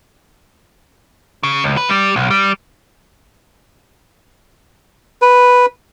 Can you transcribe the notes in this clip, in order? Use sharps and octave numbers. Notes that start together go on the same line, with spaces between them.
C#3
C#2
B4
G3
B1
G3
B4